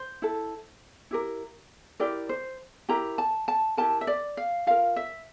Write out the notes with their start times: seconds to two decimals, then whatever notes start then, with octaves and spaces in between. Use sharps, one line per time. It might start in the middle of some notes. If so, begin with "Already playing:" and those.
Already playing: C5
0.22 E4 A4
1.11 E4 G4 A#4
2.00 E4 G4 A#4 D5
2.29 C5
2.89 E4 G4 A#4 A#5
3.18 A5
3.48 A5
3.77 E4 G4 A#4 A5
4.01 E5
4.07 D5
4.37 F5
4.67 F4 A#4 F5
4.96 E5